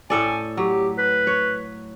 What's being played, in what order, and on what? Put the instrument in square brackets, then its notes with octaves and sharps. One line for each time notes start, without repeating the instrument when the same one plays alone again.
[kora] A2 A4 D5 [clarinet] G#5
[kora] F#3 [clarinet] G4
[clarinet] B4
[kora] C#5